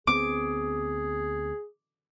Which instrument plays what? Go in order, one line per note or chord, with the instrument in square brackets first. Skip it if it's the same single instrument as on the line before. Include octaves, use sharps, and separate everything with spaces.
[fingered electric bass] D2 B3 C4 [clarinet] G#4 [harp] D6